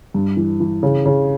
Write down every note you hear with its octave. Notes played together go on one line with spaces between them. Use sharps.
G2
E3
E3
C#3
C#3